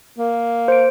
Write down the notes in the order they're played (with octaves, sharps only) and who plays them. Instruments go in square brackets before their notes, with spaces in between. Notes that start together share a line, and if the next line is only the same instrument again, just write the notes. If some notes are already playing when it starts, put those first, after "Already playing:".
[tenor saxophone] A#3
[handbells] C5 D7